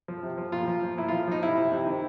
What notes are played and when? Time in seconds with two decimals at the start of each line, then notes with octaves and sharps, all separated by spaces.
0.08 F3
0.23 C3
0.38 F3
0.52 A#2 F4
0.68 F3
0.83 F3
0.97 A#2 E4
1.08 F3 F4
1.28 F3 D#4
1.43 C3 E4
1.57 C3
1.72 C3
1.87 D#3